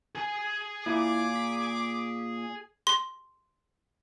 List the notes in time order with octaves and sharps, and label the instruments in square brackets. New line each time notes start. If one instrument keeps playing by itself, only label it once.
[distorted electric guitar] G#4 G#5
[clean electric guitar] A#2 [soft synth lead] E4 [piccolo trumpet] D6
[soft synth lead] B6
[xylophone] C6